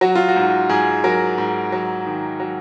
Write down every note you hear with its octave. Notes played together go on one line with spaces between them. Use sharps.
F#3 F#4
F4
F#4
G#2
G#2 G#4
F#3 A#4
G#2
F#3
D#3
F#3